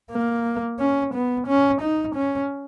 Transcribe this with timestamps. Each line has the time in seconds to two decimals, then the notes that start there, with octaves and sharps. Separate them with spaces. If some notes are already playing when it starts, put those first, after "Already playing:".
0.11 A#3
0.79 C#4
1.14 B3
1.47 C#4
1.81 D#4
2.15 C#4